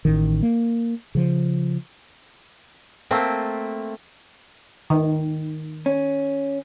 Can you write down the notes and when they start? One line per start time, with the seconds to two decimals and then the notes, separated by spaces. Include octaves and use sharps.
0.05 A1 D#3
0.43 A#3
1.15 C#3 F3
3.11 A3 A#3 C4
4.90 D#3
5.86 C#4